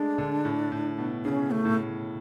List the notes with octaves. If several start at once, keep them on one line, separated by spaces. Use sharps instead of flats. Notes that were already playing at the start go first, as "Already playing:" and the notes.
Already playing: G#3 A3 D4
D3
A2
A2
B2
C#3 C#4 D4
A3
A2